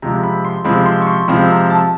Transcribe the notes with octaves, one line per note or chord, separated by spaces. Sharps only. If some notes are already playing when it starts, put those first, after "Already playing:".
C3 F3 G#3 C4 A#5
B5
C6
C3 F3 G#3 C4 B5
C6
C#6
C6
C3 F3 G#3 C4 B5
A#5
A5